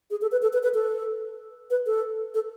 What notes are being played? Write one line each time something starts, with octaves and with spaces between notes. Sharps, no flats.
G#4
A4
B4
A4
B4
B4
A4
B4
A4
A4